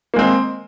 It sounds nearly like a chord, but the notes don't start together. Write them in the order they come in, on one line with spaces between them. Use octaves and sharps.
A#3 G#3 C4